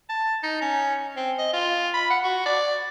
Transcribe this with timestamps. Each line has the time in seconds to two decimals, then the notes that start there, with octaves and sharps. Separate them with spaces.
0.09 A5
0.43 D#4
0.61 C#4
1.17 C4
1.39 D#5
1.53 F4
1.94 B5
2.10 F#5
2.24 F#4
2.46 D5